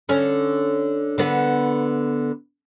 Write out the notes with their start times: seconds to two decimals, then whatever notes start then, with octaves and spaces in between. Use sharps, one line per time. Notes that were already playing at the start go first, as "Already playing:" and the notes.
0.09 D3 C#4
1.18 D3 B3 B4